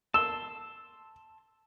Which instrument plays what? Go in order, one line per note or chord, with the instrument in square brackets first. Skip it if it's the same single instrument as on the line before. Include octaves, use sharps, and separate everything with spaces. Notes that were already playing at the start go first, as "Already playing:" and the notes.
[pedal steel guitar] A5 C6 [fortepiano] E6